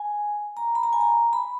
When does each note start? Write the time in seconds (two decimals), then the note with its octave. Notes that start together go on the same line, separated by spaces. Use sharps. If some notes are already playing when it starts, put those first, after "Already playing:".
Already playing: G#5
0.57 A#5
0.75 B5
0.83 A#5
0.93 G#5
1.01 A#5
1.33 B5